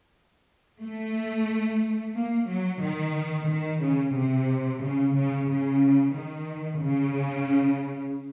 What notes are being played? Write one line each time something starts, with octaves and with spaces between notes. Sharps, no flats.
A3
A#3
F#3
D#3
D#3
C#3
C3
C#3
C#3
C#3
D#3
C#3